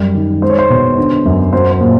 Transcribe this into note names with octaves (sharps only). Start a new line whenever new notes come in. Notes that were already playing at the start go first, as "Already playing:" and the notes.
Already playing: F#2 G3
D#3
G#3 C5
C#5
C5
B2
D3
F#2
F#3 C5
C5
A#2